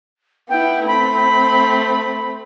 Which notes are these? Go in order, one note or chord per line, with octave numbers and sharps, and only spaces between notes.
B3 E4 G5
A3 C4 B5